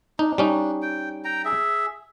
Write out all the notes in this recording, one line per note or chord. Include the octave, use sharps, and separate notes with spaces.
D4 D#4
G3 C#4 D#4
G5
G5 A#5
G#4 E5